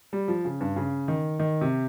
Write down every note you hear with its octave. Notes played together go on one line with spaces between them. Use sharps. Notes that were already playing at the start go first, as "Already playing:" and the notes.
G3
F3
C#3
G2
C#3
D#3
D#3
C3